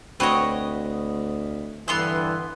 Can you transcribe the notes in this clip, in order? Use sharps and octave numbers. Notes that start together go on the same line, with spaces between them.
D2 C4 F#4 B4 C#5 D#5
G2 D3 E3 B3 C6 E6